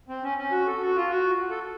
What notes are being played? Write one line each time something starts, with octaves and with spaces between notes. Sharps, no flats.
C4
C#4
C#4
F#4
A4
F#4
F4
F#4
A4